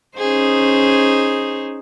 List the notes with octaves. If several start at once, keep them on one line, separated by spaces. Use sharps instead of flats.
C#4 D#4 G#4 C5